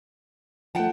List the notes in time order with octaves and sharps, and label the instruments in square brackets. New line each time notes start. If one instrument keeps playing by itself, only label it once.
[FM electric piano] F3 A3 [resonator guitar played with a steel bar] F#5 G5 A5